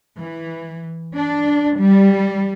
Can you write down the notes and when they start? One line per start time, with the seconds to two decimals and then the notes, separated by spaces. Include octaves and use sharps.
0.20 E3
1.16 D4
1.79 G3